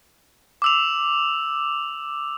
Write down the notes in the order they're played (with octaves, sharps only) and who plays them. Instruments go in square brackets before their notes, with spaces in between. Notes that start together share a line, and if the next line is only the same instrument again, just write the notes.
[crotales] D6 E6 F7